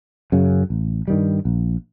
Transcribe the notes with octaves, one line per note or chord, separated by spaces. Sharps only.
F#2 C#3
A1
G2 D#3 G3
A#1